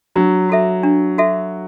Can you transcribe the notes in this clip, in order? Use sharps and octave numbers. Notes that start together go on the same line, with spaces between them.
F#3 D4
F#4 A4 E5
D4
F#4 A4 E5